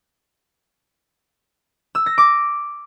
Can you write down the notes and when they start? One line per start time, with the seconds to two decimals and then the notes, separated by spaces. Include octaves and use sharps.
1.95 E6
2.06 A#6
2.18 D6